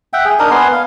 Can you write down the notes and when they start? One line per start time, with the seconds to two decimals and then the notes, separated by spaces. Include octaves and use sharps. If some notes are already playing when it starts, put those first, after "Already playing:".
0.13 E5 F#5 G5
0.25 G#4
0.39 D4 D#4 A#4 D#6
0.51 B3 F#5 G#5 C6
0.73 F5